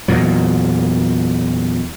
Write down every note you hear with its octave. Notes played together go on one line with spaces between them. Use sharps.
E2 A#2 F#3